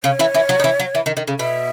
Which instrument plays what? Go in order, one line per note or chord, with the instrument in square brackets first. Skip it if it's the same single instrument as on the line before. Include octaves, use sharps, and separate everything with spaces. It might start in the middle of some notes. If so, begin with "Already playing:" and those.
[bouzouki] C#3 C#4 [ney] C#5
[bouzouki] E3 E4
E3 E4
F#3 F#4
D#4
E3 E4
F#3
E3
D#3
D#3
C#3
[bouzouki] B2 [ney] E5